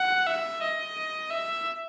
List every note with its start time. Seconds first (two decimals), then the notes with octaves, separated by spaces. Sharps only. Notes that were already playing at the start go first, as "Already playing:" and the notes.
Already playing: F#5
0.27 E5
0.62 D#5
1.31 E5